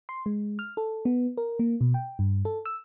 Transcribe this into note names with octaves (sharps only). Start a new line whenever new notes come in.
C6
G#3
F6
A4
B3
A#4
A#3
B2
G5
G2
A4
E6